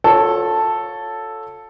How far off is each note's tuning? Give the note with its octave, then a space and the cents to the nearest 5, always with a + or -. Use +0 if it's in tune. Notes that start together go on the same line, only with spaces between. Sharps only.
F4 +40 A4 +0 C#5 +0